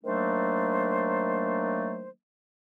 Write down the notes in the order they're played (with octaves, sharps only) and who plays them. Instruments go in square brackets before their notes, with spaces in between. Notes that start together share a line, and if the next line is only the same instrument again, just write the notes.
[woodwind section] D#3 F#3 A3 A#3 D4 C5